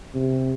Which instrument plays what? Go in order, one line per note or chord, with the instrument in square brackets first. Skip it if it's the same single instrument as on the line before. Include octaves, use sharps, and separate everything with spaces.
[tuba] C3